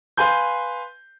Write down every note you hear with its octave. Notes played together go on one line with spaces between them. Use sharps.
B4 F5 G#5 C6 G6